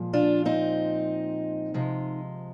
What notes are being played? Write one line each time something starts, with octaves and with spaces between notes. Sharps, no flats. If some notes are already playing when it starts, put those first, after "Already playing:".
Already playing: A#2 F3 G#3
D4 F4
C4 D#4
C3 F3 G#3